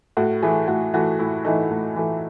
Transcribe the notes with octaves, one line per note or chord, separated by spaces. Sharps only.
A2 F#4
E3 A3 G#4
A2 F#4
E3 A3 F#4
A2 E4
E3 A3 D#4
A2
E3 A3